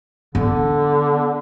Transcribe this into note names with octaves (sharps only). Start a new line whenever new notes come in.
D3 B3